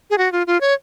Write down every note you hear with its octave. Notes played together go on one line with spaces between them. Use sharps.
G#4
F#4
F4
F4
C#5